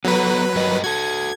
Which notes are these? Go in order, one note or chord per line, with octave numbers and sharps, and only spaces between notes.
F#3 B3 A4 B4 A#5
G2 A#4 D#5
F#4 A4 G#6